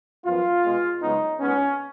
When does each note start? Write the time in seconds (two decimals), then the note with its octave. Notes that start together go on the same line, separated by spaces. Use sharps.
0.25 F#2 F3 B3 F4
0.63 B2 G#3 B3
1.01 F#2 C#3 G#3 B3 D#4
1.39 A#2 G#3 B3 C#4